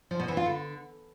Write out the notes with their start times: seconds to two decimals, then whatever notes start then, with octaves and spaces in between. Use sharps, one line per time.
0.11 F3
0.20 B2
0.28 E3
0.37 F4
0.46 D3